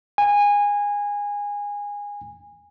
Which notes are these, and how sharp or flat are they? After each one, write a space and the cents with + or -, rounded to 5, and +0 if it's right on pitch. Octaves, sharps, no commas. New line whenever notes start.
G#5 -20